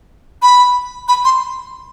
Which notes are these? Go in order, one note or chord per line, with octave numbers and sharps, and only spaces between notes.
B5
B5
C6